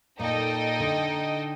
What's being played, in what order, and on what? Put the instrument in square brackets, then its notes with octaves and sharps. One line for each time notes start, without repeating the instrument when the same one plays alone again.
[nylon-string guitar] A#2 [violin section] D#4 A4 D#5 G5
[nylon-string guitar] D3